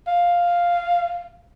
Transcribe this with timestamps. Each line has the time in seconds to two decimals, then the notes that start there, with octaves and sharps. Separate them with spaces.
0.07 F5